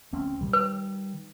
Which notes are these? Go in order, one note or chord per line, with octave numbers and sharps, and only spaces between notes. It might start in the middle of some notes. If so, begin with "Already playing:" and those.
D2 C4 C#4
D#3 G3
B4